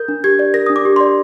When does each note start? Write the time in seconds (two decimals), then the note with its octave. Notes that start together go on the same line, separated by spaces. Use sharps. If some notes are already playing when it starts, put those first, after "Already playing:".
Already playing: A#4 G6
0.08 D4
0.24 G4 G#6
0.39 D5
0.54 A#4 A#6
0.66 D4 D#6
0.76 D6
0.85 G4
0.96 D5 C6